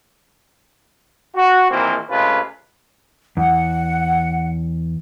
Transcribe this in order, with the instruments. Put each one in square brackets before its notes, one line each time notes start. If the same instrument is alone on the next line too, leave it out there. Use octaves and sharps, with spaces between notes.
[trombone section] F#4
A#1 D#3 E3 A#3 C4 C5
C3 G#3 A3 C#4 F4 B4
[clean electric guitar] E2 [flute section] F#5